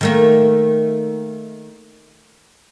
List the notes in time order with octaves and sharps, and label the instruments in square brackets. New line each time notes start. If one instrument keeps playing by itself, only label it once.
[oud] D#3 A3 A#3